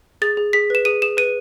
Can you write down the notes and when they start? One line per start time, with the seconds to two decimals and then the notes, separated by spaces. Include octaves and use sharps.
0.22 G#4 A6
0.37 G#4
0.53 G#4 B6
0.70 B4 E7
0.85 G#4 D#7
1.02 G#4 E7
1.17 B4 D#7